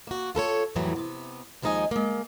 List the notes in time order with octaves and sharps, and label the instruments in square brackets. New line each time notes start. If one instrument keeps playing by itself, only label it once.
[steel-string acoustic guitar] A#3 F#4
F4 A4 A#4 C#5
F2 A2 E3 F#3 G3
C3 B3
D#2 F3 G#3 D#4 D#5 G#5
G#3 A#3